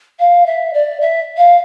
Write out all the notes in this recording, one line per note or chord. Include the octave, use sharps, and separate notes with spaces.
F5
E5
D5
E5
F5